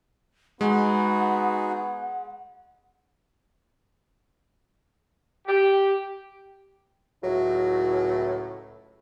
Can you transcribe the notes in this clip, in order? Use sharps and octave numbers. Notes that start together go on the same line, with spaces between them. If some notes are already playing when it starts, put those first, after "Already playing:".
G#3 B3 D#4 F#4 G#4 F#5
G4
C#2 A2 F#3